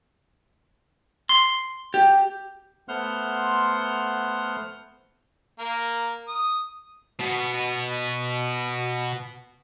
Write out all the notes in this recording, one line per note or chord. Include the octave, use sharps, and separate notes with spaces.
C6
G4
A3 B3 C5 F#5 C6 F6
A#3 A#4
D#6
B2 B3